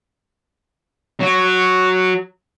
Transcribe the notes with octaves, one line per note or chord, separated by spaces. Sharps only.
F#3 F#4